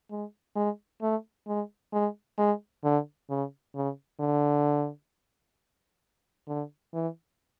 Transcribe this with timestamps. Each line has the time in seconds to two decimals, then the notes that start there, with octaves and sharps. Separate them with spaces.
0.11 G#3
0.56 G#3
1.02 A3
1.47 G#3
1.93 G#3
2.38 G#3
2.84 D3
3.30 C#3
3.75 C#3
4.20 D3
6.48 D3
6.94 E3